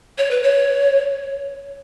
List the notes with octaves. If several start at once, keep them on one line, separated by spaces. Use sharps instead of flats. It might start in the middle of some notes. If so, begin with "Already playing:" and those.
C#5
B4
C#5